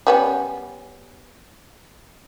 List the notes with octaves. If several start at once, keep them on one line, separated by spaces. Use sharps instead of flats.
G3 B3 C#4